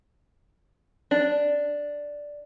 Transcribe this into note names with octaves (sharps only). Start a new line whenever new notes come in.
D4